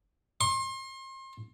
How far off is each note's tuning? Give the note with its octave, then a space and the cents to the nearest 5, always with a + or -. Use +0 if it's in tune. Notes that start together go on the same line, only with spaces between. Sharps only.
C6 +35